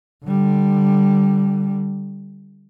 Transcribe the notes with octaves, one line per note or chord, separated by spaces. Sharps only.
D3 G3